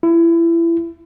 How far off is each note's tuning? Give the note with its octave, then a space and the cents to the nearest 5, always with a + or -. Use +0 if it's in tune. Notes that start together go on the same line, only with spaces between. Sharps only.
E4 +25